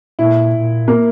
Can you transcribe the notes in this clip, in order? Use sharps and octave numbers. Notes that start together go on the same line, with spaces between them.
A#2 E4
A#2
A#3